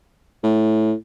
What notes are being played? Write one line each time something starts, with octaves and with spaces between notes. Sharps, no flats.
A2